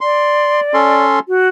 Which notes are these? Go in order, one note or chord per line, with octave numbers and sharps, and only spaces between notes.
D5 C6
C#4 A4 C6
F#4